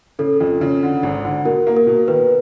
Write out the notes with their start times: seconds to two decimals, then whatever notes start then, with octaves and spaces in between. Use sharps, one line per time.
0.19 C#3 A4
0.40 F2
0.61 C#3
0.83 D3
1.03 G#1
1.25 D3
1.45 B2 A#4
1.67 A#3
1.77 A#4
1.87 B2
2.08 D#3 B4